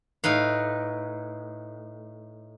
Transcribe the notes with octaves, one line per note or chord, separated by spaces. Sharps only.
A2 D#4 B4 F5